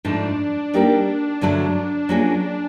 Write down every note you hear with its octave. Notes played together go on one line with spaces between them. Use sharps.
G#2 F3 A3 D4
G3 A#3 D#4 G4 A#4
G2 D3 F#3 A3 D4
F#3 A#3 C#4 F4 G#4